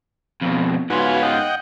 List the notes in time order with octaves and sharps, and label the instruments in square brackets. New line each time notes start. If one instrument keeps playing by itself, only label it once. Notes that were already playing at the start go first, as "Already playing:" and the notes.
[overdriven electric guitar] F2 B2
[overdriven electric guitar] G#2 F4 [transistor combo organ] F#4 B4 G#5
[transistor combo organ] D#5 F#5 G5